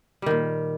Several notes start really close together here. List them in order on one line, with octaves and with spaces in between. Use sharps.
G3 D#3 A#2